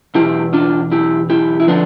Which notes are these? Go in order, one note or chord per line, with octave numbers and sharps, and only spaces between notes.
E2 B2 E4 G4
D4 F4
E4 G4
E4 G4
E4
D3 F3 B3 D4